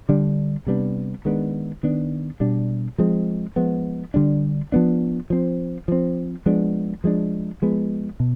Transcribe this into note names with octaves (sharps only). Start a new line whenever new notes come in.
D3 G3 D4
C3 G3 B3 D4
D#3 G#3 B3 D4
D#3 B3 D4
B2 G3 D4
F3 G#3 C4
F3 G#3 B3
D3 G3 D4
F3 B3 D4
F3 C4
F3 C4
F3 G#3 B3 D4
F3 G#3 D4
F3 G#3 B3
B2